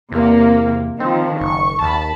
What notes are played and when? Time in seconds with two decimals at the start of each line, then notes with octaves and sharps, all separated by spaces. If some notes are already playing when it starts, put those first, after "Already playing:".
0.12 E2 C3 A#3
1.00 D#3 F3 C4
1.40 F#1 C#6
1.82 D#2 A5 B5